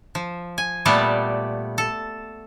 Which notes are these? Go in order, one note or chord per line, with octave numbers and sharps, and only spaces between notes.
F3
G#5
A#2 G3 A3 B3 D5 A5
A4